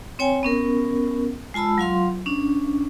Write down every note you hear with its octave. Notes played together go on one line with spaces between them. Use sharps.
C4 C#5 G5 G#5
B3 C#4 A#4
G#3 F4 A5 B5 E6
F#3 F4 F5 C6
C#4 D4